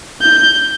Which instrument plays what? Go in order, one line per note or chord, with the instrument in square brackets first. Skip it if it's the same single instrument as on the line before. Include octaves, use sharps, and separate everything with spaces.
[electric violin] G6